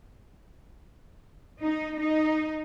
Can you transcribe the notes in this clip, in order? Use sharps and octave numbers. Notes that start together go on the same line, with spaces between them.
D#4
D#4